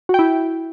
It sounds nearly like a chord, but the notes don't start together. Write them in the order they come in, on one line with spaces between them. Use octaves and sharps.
F#4 G5 E4